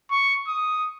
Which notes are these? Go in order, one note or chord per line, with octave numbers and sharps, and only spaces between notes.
C#6
D#6